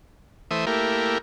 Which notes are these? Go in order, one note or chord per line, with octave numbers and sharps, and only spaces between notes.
E3 A3 C5 E5 D#6
A3 A#3 E4 G4 A#4